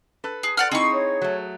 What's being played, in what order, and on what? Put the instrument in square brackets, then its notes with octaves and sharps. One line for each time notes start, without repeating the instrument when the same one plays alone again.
[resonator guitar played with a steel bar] A4 B4
[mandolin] G#4
D5 F#5 F6
[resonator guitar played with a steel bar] C4 D#4 E4 [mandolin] G#4 C#6
[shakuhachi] C#5
[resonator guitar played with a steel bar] F#3 A3